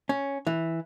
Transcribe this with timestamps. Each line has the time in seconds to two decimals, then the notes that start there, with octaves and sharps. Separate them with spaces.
0.09 C#4
0.47 E3